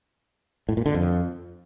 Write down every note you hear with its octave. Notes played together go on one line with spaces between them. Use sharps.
A2
A#2
D3
F2